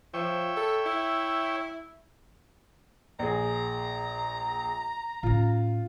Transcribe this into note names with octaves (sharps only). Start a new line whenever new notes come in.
F3 C#5 E5 G5
A4
E4
A#1 G#4 A#5
A2 C#4 F4